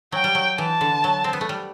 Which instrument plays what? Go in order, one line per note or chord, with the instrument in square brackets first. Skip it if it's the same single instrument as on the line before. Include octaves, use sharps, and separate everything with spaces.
[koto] F#3 [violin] G5
[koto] G3
F#3
[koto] E3 [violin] A5
[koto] D3
F#3
C4
B3
A3
G3